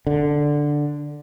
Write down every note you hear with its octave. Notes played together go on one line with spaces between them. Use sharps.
D3